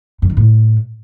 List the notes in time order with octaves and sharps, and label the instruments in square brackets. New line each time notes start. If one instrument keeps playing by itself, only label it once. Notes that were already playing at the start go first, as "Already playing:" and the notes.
[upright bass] G2
D#3
A2